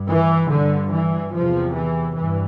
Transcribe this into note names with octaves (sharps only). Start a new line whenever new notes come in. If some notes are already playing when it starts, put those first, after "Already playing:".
Already playing: G2
E3
G2 D3
E3
E2 C3 F3
E3
G2 E3